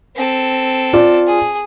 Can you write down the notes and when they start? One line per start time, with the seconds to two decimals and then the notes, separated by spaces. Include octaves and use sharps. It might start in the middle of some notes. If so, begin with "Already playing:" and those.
0.16 C4 A4
0.93 F4 D5
1.27 G#4